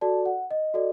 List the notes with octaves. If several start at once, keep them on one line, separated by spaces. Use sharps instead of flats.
F#4 A4 D5 A5
F#5
D#5
F#4 A4 D5